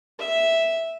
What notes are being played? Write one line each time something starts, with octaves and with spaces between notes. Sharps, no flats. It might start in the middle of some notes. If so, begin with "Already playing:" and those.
E5